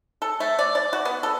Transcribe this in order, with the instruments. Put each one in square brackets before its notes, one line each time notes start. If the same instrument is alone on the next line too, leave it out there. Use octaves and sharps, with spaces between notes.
[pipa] A4
A3
D5
D5
F#4
B3
A4